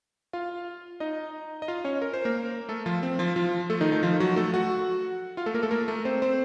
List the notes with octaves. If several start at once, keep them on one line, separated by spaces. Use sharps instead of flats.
F4 F5
D#4 D#5
D#5
F4 F5
C#4 C#5
A#4
C5
A#3 A#4
A3 A4
F3 F4
C4
F3 F4
F3 F4
A3 A4
D#3 D#4
D#3 D#4
F3 F4
F#3 F#4
A3 A4
F#4 F#5
F4 F5
A3 A4
A#3 A#4
A3 A4
A#3 A#4
A3 A4
C4 C5
C4 C5